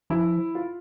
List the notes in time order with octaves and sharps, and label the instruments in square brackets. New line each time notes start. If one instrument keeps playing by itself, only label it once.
[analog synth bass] F3 [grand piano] E4
[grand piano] F4